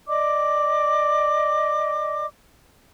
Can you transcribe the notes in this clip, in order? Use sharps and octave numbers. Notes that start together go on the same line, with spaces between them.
D5 D#5 D6